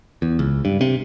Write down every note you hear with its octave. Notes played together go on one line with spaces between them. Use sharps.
E2
C#2
G2
C3